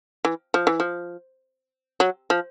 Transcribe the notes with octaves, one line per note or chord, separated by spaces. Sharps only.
E3
F3
E3
F3
F#3
F3